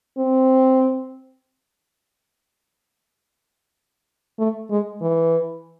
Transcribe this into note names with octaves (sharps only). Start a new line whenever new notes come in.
C4
A3
G#3
E3